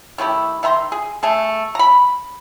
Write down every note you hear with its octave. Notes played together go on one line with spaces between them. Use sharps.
D#3 A3 E4 G4
D#3 E5 A#5 C6
G#4
A3 G#4 A4
A#5 B5